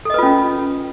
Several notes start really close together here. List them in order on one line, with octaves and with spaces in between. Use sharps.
A4 D#5 B4 F4 C#4